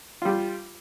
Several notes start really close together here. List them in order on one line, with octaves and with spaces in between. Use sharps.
F4 G3 G4